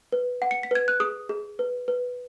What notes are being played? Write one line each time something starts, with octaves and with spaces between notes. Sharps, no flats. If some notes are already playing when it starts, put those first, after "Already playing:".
B4
F#5
C#7
B6
B4 G#6
F#6
G#4 D#6
G#4
B4
B4